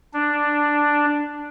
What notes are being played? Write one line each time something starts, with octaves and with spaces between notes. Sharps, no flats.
D4